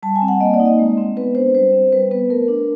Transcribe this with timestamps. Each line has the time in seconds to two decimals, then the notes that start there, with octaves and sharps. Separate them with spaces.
0.03 G3 A5
0.15 G#5
0.22 C4
0.28 F#5
0.40 A#3 D#5
0.54 D5
0.60 D#4
0.66 D#5
0.79 G#3
0.98 C4
1.16 B3 B4
1.35 D4 C5
1.55 G3 C5
1.73 C4
1.93 G3 B4
2.11 B3 B4
2.30 A3 A#4
2.48 D4